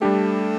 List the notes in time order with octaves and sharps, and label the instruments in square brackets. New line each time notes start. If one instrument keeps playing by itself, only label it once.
[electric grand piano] G3 D4 G4 [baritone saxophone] A3